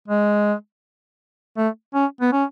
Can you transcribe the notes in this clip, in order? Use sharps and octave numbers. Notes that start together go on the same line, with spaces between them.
G#3
A3
C#4
B3
C#4